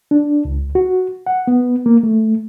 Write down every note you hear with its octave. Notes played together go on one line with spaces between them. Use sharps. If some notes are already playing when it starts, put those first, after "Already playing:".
D4
C#2
F#4
F#5
B3
A#3
A3